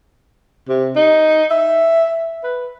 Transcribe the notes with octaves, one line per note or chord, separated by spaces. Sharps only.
C3
D#4
E5
B4